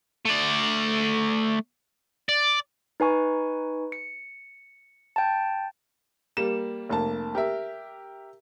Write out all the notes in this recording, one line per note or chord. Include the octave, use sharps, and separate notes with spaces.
A3 D5
D5
D#4 B4 G#5 C#6
C#7
G5 A5
G3 A#3 E7
F1 A#3 A5
G4 A#4 E5